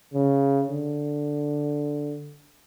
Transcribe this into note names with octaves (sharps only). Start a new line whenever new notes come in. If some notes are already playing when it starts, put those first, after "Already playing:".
C#3
D3